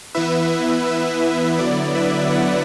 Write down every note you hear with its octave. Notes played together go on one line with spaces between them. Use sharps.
E3 B3 E4 B4 E5
B4
D3 F#3 B3 E4 D5
B4 E5
D5 F#5